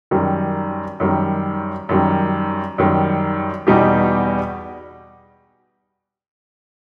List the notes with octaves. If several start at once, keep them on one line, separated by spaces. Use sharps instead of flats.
F#2 D#3 G3
F#2 D#3 G3
F#2 D#3 G3
F#2 D#3 G3
E2 B2 G3 D#4 G4